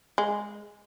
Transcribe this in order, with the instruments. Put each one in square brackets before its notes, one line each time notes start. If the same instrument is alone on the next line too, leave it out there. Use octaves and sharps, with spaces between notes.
[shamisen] G#3